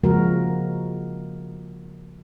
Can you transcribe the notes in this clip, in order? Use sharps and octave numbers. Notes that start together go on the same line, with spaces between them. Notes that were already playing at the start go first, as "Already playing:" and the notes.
C#3 F3 G#3 A#3 F#4 A#4